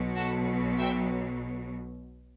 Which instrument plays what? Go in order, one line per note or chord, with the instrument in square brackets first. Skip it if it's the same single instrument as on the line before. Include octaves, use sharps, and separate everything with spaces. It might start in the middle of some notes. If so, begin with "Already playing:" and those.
Already playing: [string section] B1 B2 F#3
F#4 A4
E5 G5